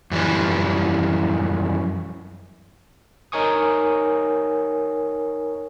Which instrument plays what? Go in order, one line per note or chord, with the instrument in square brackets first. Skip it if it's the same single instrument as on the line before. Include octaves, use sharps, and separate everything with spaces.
[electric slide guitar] F#2 E3 F3 G3
[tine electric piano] D#4 A#4 C#5 G#5 C#6 D#6